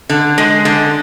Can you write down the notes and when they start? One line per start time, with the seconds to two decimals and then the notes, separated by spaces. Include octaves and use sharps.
0.10 D3
0.38 G#3
0.65 D3